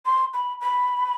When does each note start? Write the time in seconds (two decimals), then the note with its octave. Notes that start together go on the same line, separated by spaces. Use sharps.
0.06 C6
0.34 B5
0.61 B5